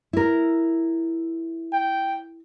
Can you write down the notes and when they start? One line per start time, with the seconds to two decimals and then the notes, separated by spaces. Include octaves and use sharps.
0.13 E4 A#4
1.73 G5